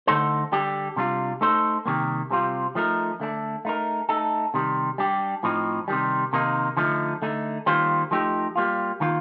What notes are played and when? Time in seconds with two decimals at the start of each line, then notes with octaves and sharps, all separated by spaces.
0.07 D3 A3 D#4 A4 C5
0.52 D3 G3 D4 G4
0.96 C3 G3 D4 F4
1.41 A3 D#4 A4 C5
1.86 C3 D#3 G3 A#3
2.31 C3 G3 C4 F4
2.75 F3 A3 D#4 A#4
3.20 D3 A3 D4
3.65 A3 D#4 A#4
4.09 A3 D#4 A4
4.54 C3 D#3 G3
4.98 G3 D4 G4
5.43 A2 F3 C4 D#4
5.88 C3 D#3 G3
6.33 C3 D#3 A#3 D#4
6.77 D3 F3 A3 D#4
7.22 D3 A3 D#4
7.66 D#3 G3 A#3 F4 C5
8.11 F3 A3 D#4 G4
8.56 G3 A#3 F4
9.01 D#3 A#3 F4